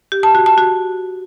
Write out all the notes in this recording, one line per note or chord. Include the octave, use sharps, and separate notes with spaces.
G4
A5
F#4
A5
F#4